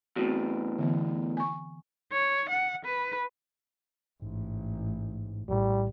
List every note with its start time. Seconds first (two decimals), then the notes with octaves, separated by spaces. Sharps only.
0.16 E2 A2 C4 F#4
0.78 D3 E3 B3
1.37 G#5 C#6
2.12 C#5
2.49 F#5
2.85 B4
4.22 A1 G#2
5.49 A#1 A2 G3